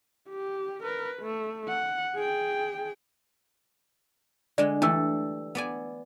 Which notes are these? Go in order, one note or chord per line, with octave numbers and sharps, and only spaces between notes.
G4
A#4 B4
A3
F#5
G#4 G5
D3 G#3 D5
E3 G3 A3 D4 E6
B3 D5 G#5